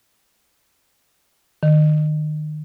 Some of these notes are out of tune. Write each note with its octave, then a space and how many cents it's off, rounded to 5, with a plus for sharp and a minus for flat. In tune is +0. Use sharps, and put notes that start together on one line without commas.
D#3 -30